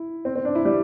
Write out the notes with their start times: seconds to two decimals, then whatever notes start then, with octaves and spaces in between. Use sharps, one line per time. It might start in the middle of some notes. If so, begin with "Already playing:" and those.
Already playing: E4
0.25 C4
0.36 C4
0.45 D4
0.55 E4
0.65 G3